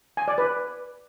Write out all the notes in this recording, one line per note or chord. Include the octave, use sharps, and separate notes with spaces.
G#5
D5
B4